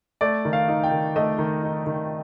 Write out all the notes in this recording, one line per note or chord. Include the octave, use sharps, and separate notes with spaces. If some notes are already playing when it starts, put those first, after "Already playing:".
A3 D5
D#3
F5
D#4
G5
D#3
A3 D#5
D#3
D#4
D#3